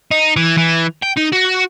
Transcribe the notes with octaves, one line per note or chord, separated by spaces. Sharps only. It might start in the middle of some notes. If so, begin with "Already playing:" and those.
D#4
E3
E3
G5
D#4
F#4